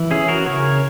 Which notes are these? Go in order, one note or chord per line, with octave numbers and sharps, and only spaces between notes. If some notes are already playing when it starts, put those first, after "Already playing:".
Already playing: E3
C#4 E4 G#4
F#4 A#4
C#3 A#4 C#5